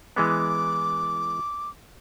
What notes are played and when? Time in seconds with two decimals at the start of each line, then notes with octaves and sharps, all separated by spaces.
0.16 E3 G#3 B3 D6